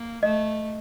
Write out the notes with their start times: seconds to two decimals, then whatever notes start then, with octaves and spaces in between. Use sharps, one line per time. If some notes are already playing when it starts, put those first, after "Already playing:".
Already playing: A#3
0.23 A3 D#5